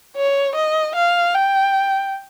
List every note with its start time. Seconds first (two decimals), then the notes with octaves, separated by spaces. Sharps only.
0.16 C#5
0.55 D#5
0.96 F5
1.34 G5